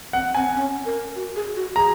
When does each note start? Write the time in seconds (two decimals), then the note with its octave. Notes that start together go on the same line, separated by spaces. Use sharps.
0.13 C4 F#5
0.34 C4 G#5
0.54 C#4
0.85 A#4
1.15 F#4
1.36 G#4
1.55 F#4
1.76 G#4 A#5